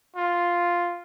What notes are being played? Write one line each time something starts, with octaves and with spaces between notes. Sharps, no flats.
F4